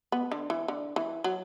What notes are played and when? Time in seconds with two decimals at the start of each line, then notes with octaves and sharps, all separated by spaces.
0.12 B3
0.32 D3
0.50 E3
0.68 D3
0.96 E3
1.24 F#3